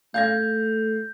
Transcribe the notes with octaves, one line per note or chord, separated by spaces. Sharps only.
A3 F5 G6 G#6 A#6